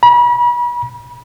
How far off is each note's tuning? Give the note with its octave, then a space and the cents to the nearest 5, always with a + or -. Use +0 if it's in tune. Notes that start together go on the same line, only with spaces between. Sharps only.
B5 -40